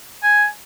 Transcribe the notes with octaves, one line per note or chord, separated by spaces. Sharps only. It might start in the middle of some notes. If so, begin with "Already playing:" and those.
G#5